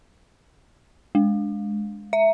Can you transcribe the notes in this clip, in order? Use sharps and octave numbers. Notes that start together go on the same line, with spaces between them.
G#3
E5